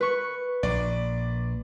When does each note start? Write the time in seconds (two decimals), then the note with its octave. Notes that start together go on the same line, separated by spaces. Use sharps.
0.01 B4 C#6
0.63 A#1 D5